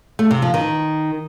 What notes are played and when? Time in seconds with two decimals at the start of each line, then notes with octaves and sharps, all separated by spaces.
0.19 A3
0.31 C3
0.42 F3
0.54 D#3